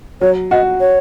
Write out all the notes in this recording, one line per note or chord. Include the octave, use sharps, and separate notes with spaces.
F#3 C#5
F#4 D#5
C#5